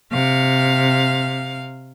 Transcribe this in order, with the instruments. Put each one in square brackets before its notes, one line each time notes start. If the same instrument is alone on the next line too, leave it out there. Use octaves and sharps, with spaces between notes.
[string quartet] C3 F5